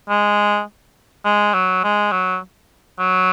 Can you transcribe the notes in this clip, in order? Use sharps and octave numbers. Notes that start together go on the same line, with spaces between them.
G#3
G#3
F#3
G#3
F#3
F#3